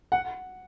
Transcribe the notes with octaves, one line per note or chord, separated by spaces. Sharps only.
F#5